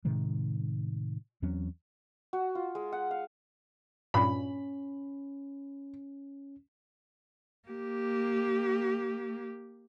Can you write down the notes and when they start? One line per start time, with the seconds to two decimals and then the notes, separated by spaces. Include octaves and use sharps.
0.05 A2 C3 D#3 G#3
1.42 E2 F#3 C4 C#4
2.33 F#4
2.55 F4
2.75 G#3
2.92 F#5
3.11 F5
4.14 G2 A#2 C#4 B5
7.68 A#3 G4